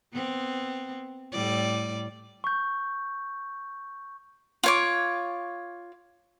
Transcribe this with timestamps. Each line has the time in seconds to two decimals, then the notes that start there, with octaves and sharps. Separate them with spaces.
0.12 B3 C4
1.32 A2 G3 D5
2.44 C#6 G6
4.63 F4 C#5 D6